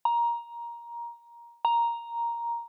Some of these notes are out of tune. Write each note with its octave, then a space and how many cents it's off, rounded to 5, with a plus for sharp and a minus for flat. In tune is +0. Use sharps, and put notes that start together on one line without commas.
A#5 +15
A#5 +5